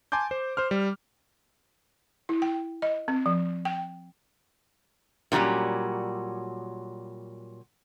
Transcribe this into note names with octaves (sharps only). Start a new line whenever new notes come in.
G#5 A5 C6 D6 G6
C5
C5 C6 F6
G3
E4
G5
D#5
C4
F3
G5
A#2 D3 F#3 G3 C#4